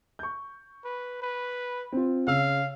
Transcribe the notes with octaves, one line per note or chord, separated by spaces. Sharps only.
C#6 G6
B4
B4
C4 F4
C#3 F5 E6